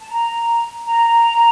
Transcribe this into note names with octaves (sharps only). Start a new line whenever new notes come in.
A5
A#5
A#5